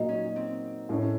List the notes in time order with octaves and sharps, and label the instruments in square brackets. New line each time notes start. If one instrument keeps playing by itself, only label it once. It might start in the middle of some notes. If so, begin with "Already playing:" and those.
Already playing: [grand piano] A#2 F#3 A#3 [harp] D#4
[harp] C#4
C4
[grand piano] A2 A3 C#4